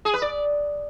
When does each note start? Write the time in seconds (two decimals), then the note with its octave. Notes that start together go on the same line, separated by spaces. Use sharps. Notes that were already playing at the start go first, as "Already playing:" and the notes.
0.05 G#4
0.14 B4
0.22 D5